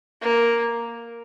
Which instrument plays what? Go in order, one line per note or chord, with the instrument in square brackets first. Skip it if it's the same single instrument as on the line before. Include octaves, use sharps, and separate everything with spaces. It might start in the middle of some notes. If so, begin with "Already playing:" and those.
[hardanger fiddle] A#3